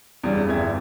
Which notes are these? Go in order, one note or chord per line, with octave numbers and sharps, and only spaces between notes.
E2 G2 C#3 G3
G1 E2 E5 G#6